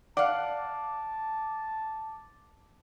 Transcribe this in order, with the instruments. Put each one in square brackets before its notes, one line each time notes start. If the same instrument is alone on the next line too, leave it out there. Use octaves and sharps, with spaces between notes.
[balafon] D5 [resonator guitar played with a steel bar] F5 F#5 [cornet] A5 [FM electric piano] D6